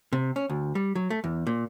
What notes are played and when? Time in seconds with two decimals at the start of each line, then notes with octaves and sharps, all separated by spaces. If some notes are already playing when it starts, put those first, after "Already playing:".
0.13 C3
0.36 C#4
0.50 D2
0.75 G3
0.95 F#3
1.10 A3
1.24 E2
1.47 A#2